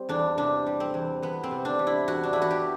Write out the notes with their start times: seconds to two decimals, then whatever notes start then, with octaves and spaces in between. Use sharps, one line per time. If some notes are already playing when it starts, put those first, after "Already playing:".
Already playing: G3 C4
0.09 E2 D4
0.38 C3 D4
0.66 G3
0.80 C4
0.94 E2
1.22 E2 B3
1.43 C4
1.51 C3
1.65 D4
1.79 G3
1.87 E4
2.07 E2 F#4
2.23 D4
2.33 E2 E4
2.42 F#4
2.51 G4